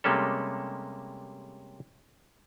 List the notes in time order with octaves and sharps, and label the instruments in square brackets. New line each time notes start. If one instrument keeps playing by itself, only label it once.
[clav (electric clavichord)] C3 G3 G#3 A#3 C#4 A4